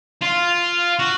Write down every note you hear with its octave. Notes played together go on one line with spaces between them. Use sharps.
F4
F#4